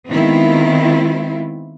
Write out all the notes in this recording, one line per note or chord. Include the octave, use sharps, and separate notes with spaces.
D#3 G#3 B3 C4 E4 F4